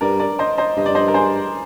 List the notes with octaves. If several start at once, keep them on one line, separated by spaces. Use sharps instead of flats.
G2 A#4 D5
A#4 D5
C5 D#5
C5 D#5
G2 D#5
D5
C5 D#5
A#4
G#4 C5